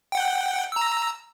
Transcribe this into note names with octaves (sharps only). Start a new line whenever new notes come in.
F#5 G5
A#5 E6